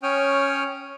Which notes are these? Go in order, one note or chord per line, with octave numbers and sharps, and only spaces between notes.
C#4 C#5 G5 D#6 F6